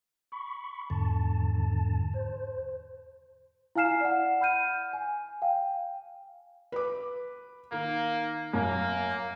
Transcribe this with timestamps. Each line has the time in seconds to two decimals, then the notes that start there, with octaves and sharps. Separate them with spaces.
0.32 B5 C#6
0.90 E2 G#2 D3 A5
2.14 C5
3.75 E4 F5 G#5 F6 C7 E7
4.01 D5 F#5
4.40 F#5 B5 F6 G6 D#7
4.93 G#5
5.42 F5 G5
6.72 B4 D6
7.72 D#3 A#3
8.54 F#2 A#3